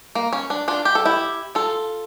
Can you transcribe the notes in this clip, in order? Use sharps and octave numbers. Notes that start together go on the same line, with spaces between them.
A#3
C#4
D4
D4 F4
G4
A4
E4 G4
F4 A4